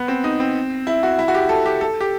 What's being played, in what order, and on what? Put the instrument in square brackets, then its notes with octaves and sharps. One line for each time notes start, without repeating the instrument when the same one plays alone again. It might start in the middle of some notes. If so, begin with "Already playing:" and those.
Already playing: [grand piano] B3
C4
D#4
C4
E4
F#4
E4
F#4
G4
A4
G4
A4
G4